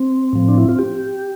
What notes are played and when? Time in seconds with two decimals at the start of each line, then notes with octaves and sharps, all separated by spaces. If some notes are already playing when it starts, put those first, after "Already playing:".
Already playing: C4
0.33 A2 F3
0.48 D4
0.58 E4
0.69 F4
0.79 G4